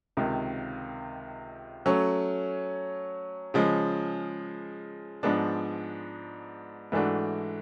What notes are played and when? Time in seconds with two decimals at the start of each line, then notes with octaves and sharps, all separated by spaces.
0.17 C#2 C3 D#3
1.86 F#3 A3 C#4
3.54 C#3 F3 G#3
5.23 G#2 F3 G#3 B3 D4
6.92 G#2 E3 A3 D4 F#4